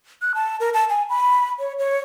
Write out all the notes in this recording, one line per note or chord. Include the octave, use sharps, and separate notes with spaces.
F#6
A5
A#4
A5
G#5
B5
C#5
C#5